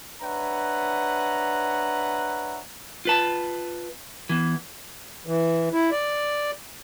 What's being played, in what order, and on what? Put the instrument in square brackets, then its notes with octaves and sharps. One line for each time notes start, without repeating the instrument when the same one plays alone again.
[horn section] D4 B4 C#5 E5 F#5 A#5
[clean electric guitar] F4 B4 A5
E2 E3
[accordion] E3
E4
D5